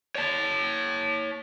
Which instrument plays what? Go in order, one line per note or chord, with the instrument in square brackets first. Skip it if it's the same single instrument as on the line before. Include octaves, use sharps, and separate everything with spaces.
[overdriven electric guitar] C#5 A5